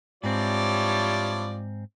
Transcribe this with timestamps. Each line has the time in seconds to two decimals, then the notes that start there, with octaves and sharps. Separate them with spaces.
0.24 G#2 F3 G3 C4 D4 E4 C#5 D5